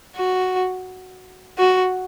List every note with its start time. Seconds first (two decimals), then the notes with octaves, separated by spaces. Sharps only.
0.16 F#4
1.58 F#4